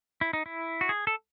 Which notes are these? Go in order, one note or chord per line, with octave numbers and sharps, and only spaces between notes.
E4
D#4
E4
F#4
G#4
A4